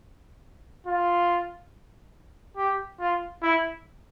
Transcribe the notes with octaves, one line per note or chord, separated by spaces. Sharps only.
F4
G4
F4
E4